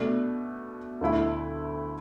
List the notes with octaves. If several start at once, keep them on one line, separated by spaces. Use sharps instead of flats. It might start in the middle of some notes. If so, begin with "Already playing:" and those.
Already playing: B2 A3 D4
D2 D3 A3 E4